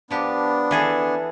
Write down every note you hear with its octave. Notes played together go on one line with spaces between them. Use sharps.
F3 B3 D4 G4
E3 G#4 A4